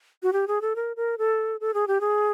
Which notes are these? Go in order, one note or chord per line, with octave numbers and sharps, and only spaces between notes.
F#4
G4
G#4
A4
A#4
A#4
A4
A4
G#4
G4
G#4